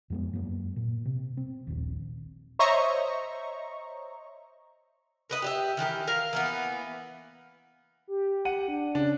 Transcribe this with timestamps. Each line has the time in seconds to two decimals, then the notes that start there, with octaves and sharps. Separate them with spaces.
0.10 F2 G#3 B3
0.33 F#2 A#3 B3
0.76 A#2
1.05 C3
1.37 C4
1.67 D#1 A#1 D#2
2.59 C5 C#5 D#5 E5 A#5 C#6
5.30 A#4 B4 D#5
5.42 G4 D#5 E5
5.77 D#3 E3 G4 A#4
6.07 A#4 F5
6.33 E3 A#3 B3
8.08 G4
8.45 F#5 D#7
8.68 D4
8.95 C#3 D4